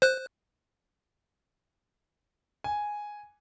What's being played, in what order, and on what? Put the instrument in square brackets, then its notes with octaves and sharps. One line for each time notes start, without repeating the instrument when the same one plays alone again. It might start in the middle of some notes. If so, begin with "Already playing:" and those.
[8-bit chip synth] C5 F#6
[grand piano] G#5